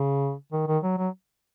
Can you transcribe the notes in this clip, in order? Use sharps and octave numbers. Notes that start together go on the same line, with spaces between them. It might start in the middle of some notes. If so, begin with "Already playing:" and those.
Already playing: C#3
D#3
D#3
F#3
F#3